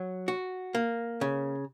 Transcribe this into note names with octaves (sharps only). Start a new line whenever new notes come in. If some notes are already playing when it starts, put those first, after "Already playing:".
Already playing: F#3
F#4
A#3
C#3